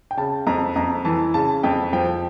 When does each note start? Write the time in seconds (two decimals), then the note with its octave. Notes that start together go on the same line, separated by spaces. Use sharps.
0.11 G5
0.17 C#3 A5
0.47 F2 A#5
0.76 F2 A#5
1.05 E3 A5
1.34 C#3 A5
1.63 F2 G5
1.93 F3 G5